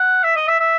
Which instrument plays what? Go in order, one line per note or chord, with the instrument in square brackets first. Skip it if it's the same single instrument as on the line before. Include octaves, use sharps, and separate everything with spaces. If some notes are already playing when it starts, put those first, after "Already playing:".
Already playing: [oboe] F#5
E5
D#5
E5
E5